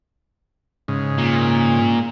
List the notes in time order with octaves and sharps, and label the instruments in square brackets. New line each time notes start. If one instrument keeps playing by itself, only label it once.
[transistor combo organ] G#2 C#3
[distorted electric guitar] A#2